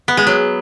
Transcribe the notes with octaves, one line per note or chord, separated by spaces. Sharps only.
B3
G#3
F#3